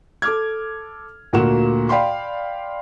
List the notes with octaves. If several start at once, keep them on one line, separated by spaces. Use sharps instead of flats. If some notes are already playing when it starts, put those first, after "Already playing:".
A4 D6 F6 G#6
D2 A#2 A#3 F#4 F#5 E7
D5 F5 G5 B5 C6